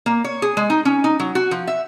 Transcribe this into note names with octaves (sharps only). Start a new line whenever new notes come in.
A#3
C#5
G#4
G#3
D#4
C#4
D#4
F#3
F#4
F3
E5